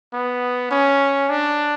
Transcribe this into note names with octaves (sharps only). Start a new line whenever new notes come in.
B3
C#4
D4